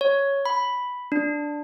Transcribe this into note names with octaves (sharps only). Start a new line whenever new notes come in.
C#5
B5
D4